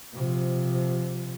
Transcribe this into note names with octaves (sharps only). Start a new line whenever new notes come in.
C3 F3